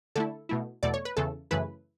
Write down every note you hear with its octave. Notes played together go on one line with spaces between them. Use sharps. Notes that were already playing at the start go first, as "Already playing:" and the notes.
D3 A3 E4 A4
B2 A3 E4
E2 B2 A3 D5
C#5
B4
E2 C#3 E3 A4
F#2 C#3 E3 A3 E4 B4